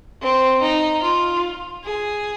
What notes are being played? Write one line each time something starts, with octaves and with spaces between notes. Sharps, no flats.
C4
D#4
F4
G#4